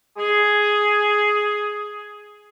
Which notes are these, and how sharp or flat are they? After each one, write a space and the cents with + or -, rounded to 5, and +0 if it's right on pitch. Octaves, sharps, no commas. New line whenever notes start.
G#4 +5